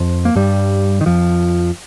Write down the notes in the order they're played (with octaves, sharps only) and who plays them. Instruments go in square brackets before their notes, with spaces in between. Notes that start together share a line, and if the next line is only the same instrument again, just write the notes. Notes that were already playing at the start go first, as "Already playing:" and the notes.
Already playing: [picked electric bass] F2 F3
A#3
G2 G3
D#3
F2 F3